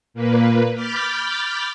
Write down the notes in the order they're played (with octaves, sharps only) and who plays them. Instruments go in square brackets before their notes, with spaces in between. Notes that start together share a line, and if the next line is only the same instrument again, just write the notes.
[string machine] A#2 A#3 B4
B5 D6 F6 G6 A6 B6